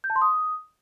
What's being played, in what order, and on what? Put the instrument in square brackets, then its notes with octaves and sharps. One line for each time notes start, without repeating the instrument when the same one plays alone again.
[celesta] G6
A5
C6
D#6